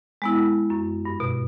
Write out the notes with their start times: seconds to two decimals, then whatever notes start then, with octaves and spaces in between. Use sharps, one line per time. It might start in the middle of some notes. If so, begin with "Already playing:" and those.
0.22 G#3 B3 E4
0.70 F#2
1.05 G2
1.20 B2